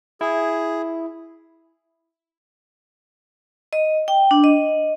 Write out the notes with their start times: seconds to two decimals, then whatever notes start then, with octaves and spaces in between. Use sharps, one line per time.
0.21 E4 G#4
3.73 D#5
4.08 G5
4.31 D4
4.44 D#5